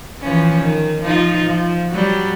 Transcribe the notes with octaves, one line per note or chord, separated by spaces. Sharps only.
E3 F3 C#4
D#3
F3 D#4 F4
F3
F#3 G3